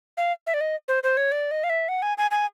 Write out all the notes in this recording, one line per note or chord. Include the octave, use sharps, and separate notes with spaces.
F5
E5
D5
D#5
C5
C5
C#5
D5
D#5
F5
E5
F#5
G#5
G#5
G#5